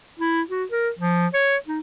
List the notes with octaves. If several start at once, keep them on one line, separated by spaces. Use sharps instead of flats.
E4
F#4
A#4
F3
C#5
D#4